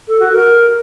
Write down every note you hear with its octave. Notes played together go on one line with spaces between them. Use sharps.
A4
F#4
A#4